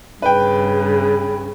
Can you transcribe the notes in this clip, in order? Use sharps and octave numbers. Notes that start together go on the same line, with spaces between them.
G2 C#3 B4 G5